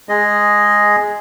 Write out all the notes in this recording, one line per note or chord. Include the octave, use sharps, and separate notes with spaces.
G#3 G#4 D#5